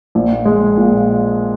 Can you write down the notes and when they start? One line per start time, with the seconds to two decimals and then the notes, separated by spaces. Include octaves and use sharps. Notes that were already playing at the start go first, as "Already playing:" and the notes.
0.15 A#1
0.45 G#3
0.77 A#2